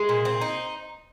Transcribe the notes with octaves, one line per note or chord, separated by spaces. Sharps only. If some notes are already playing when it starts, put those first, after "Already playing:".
Already playing: G#3
A#2
C4
D#4